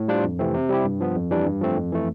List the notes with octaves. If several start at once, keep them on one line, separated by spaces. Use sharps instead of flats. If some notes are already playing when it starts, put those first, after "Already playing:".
Already playing: A2
G3 D4 F4 C5
F2
C3 E3 A3 C4
C3
G3 C4 E4 G4
G2
F3 B3
F2
E3 G3 D4
G2
F3 A3 C4
F2
E3 A3